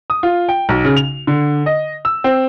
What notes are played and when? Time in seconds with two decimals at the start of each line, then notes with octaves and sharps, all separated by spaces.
0.10 D#6
0.23 F4
0.49 G5
0.69 B1
0.84 C#3
0.96 F7
1.27 D3
1.66 D#5
2.05 E6
2.24 C4